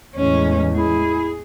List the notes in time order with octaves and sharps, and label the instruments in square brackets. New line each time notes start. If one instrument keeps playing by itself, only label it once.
[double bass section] E2 A2 G#3 [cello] C#4
[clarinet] E4 [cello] G#4